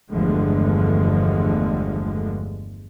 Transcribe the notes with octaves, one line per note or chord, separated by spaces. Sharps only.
G1 E2 D3 F3 G#3 A3